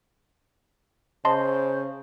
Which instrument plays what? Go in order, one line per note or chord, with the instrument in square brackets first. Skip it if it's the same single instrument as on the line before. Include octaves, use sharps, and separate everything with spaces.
[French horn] C#3 [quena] C5 [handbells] D#5 A5 C6